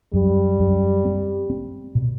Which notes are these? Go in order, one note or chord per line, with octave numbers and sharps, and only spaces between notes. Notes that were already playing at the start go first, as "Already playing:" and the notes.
F#2 G3
F#2
C4
C4
B2